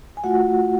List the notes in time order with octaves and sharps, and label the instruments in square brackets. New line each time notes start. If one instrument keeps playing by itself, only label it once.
[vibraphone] G#5
A3 F4 F#4 F#5